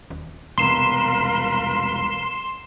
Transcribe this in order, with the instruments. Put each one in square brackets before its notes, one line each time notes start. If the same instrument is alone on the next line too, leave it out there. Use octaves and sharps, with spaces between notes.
[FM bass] D#1
[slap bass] E1 C2 [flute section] A#4 B4 F5 [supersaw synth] C6 E7